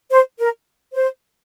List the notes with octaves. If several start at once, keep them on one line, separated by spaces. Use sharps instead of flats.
C5
A#4
C5